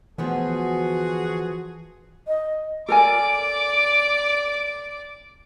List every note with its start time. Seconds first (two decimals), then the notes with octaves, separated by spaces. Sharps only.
0.18 D2 E3 F3 B3 F#4 G#4
2.28 D#5
2.89 A4 A#4 D5 G#5 D6